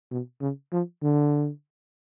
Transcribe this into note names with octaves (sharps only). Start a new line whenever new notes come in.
B2
C#3
F3
D3